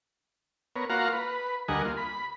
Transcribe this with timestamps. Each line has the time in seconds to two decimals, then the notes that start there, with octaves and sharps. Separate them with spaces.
0.76 B3 A#4 C#5
0.90 A#3 F4 F#4 F5 F#5 A#5
1.13 B4
1.68 D2 G3 A#4 D#5 F#5 G#5
1.85 A#3 F4
1.97 B5